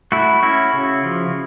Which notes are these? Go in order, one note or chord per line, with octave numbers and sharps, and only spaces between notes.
A3 E4 F#4
C#4 E4 F#4
C#3
F3